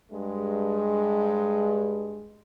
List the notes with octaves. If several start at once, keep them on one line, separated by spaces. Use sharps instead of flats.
G2 G#3